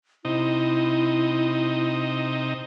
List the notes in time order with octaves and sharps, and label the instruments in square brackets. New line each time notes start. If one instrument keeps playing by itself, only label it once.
[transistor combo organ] C3 D#4 [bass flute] E4